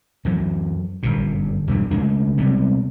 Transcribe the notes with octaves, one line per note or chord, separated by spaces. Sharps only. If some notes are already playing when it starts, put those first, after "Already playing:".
F#2 E3 F#3
G1 F#2 A#2
E2 G2 B2
C#3 G#3 A3 D4
C3 G3 G#3 B3